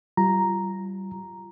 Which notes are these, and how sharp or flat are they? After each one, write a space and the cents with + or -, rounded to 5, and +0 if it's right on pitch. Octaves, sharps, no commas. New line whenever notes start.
G3 -30 F4 -25 A#5 +0